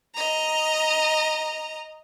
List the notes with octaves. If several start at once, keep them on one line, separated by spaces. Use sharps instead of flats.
D#5 A#5